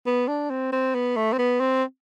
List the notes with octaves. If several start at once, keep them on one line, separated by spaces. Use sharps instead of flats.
B3
D4
C4
C4
B3
A3
C4
B3
C4